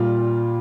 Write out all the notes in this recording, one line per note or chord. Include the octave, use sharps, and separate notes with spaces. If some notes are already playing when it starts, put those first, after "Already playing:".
Already playing: A#2 G3 F4